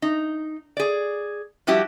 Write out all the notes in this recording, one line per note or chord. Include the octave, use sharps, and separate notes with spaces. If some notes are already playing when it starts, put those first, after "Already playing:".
D#4
G#4 D5
F3 G3 E4 F#4 G4